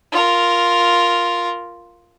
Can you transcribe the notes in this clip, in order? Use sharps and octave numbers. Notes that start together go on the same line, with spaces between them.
F4 A#4